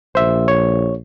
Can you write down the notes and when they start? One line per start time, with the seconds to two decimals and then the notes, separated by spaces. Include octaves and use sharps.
0.15 A#1 C5 E5
0.48 C#5